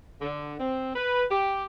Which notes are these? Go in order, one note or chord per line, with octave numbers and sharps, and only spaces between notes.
D3
C4
B4
G4